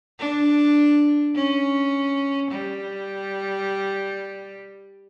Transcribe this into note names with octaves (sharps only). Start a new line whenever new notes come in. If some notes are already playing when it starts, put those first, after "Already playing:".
D4
C#4
G3